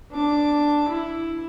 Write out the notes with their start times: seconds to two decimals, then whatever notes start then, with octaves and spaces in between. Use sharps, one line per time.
0.11 D4 D6
0.88 E4